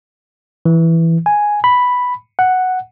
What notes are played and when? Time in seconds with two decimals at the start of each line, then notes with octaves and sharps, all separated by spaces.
0.65 E3
1.26 G#5
1.64 B5
2.39 F#5